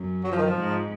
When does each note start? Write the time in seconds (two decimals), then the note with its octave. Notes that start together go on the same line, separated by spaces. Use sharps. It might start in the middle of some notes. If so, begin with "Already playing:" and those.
Already playing: F#2
0.24 F#3
0.32 F3
0.38 D#3
0.46 F3
0.56 G#2